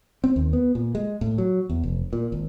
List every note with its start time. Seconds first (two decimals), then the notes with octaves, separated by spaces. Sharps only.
0.24 C4
0.36 D#2
0.53 B3
0.75 A#2
0.95 G#3
1.21 A2
1.38 F#3
1.70 E2
1.84 F1
2.13 A#2
2.32 G#1